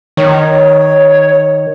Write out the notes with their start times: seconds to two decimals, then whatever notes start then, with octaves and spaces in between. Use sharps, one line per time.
0.17 D#3 C#5